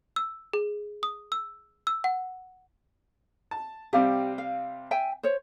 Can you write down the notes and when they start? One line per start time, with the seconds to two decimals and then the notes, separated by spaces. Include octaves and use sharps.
0.16 E6
0.53 G#4
1.03 D#6
1.32 E6
1.87 E6
2.04 F#5
3.51 A5
3.93 C3 G3 C4 G4 F5 G5
4.38 F5
4.91 E5 G5 G#5
5.23 C5 C#5